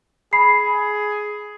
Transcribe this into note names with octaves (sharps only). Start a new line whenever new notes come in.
G#4 B5 C7